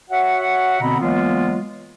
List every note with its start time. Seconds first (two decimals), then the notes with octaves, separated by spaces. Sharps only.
0.10 F#4 C#5 E5 F#5
0.80 B2 D3 B3 C4 A#5 B5
1.00 E3 F#3 G#3 A#3 B3 F4